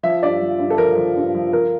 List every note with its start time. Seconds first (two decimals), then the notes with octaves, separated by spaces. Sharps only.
0.03 F3 E5
0.22 G2 D5
0.41 F3
0.59 G2
0.70 A4
0.78 F3 A#4
0.96 F3
1.16 G2
1.35 F3
1.52 F3 A#4